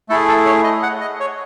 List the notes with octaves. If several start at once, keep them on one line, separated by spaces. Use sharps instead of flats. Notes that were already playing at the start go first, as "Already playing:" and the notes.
A3 E4 G#4 A4
A4
C#5
D#5
F#5
D#5
C#5